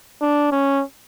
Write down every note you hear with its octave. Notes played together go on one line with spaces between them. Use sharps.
D4
C#4